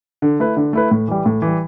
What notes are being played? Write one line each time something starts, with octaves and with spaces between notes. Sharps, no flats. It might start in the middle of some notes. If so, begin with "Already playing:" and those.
D3
A3 E4 B4
D3
A3 E4 B4
A2
E3 G3
A2
E3
G3